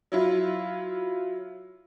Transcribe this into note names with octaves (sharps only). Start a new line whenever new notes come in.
F#3 E4 F4